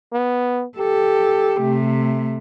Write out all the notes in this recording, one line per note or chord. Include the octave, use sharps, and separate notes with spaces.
B3
G4 A4
C3 A3